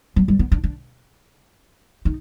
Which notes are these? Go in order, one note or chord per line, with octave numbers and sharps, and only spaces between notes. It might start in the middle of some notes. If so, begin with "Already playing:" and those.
F#3
G3
B3
D4
D4
D#4